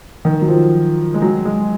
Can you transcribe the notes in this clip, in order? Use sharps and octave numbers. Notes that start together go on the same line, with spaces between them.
D#3
F#3
F3
G#3
F#3
G#3